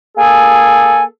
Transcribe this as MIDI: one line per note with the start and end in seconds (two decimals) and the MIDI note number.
0.18 1.03 58
0.18 1.03 68
0.18 1.03 69
0.18 1.03 80